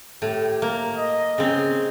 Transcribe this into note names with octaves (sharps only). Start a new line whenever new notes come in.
A2 G4
A#3 A#4
D#5
C#3 C4